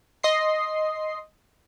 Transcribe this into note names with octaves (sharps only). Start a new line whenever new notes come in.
D#5 C6 C7